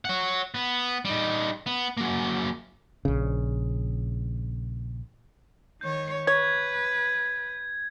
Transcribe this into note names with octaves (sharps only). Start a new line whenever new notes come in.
C#5 F#5
B3
G3 D#4
B3
F#3 A#3
A#1 C#3
D#3 C#5 G6
B4 C#5 G#6